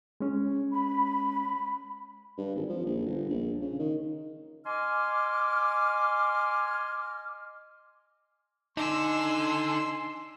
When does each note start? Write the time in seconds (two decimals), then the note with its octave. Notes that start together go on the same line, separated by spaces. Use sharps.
0.20 G#3 C#4
0.73 B5
2.38 G2
2.55 G#1
2.69 F3
2.85 A#1
3.06 G1
3.29 A#1
3.61 C#3
3.79 D#3
4.65 D#5 G#5 C6 D6 F6
8.77 D3 D4 D#4 G#5 C6 E6